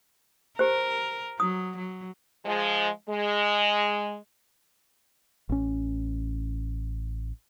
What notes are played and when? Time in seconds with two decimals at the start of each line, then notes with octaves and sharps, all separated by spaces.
0.59 G4 A#4 C5
1.40 F#3 D#6
1.77 F#3
2.45 F3 G#3
3.10 G#3
5.49 A1 C#4